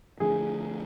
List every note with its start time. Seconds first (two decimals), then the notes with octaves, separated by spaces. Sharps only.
0.20 D3 F3 A3 D4 G#4